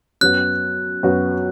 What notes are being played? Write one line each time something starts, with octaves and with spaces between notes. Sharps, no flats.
F#2 F#3 B3 F#4 F#6
F#2 F#3 B3 F#4